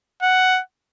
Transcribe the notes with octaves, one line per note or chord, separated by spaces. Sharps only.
F#5